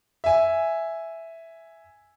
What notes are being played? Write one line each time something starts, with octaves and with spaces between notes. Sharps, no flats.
E5 G#5